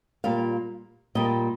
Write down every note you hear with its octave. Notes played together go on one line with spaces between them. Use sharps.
A#2 G3 A#3 F5
A#2 G3 A#3 D#5